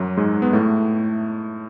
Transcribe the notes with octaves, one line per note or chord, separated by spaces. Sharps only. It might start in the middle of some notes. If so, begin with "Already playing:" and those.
Already playing: F#2 F#3
G#2 G#3
B3
A2 A3